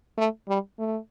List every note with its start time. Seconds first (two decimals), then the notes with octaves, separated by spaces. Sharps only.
0.18 A3
0.48 G3
0.79 A3